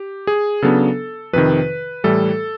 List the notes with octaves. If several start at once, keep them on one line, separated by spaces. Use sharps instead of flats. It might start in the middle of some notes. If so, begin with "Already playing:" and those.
Already playing: G4
G#4
C#3 F#3 B3 D4 A4
F2 C3 D#3 B4
A2 E3 G3 A4